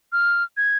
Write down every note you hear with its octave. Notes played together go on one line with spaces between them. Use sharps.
F6
G#6